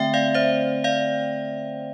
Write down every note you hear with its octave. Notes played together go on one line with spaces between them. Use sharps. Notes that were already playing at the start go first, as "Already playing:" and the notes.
Already playing: D3 A3 C4 E5 G5
D5 F5
C5 E5
D5 F5